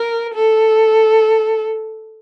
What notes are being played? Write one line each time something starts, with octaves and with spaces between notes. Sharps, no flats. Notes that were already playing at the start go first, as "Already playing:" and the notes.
Already playing: A#4
A4